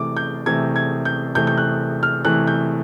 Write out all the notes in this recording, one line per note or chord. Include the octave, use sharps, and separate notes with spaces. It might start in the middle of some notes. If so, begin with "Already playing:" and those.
Already playing: C3 E3 A3 D6
G6
C3 E3 A3 G#6
G#6
G6
C3 E3 A3 G6
G6
F#6
F6
C3 E3 A3 F#6
G6